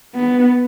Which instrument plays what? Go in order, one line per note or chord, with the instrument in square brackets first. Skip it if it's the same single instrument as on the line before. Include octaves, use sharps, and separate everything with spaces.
[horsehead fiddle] B3